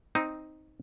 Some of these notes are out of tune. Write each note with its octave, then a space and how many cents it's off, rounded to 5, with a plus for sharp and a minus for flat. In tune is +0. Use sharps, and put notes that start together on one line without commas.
C4 +0 D#4 +0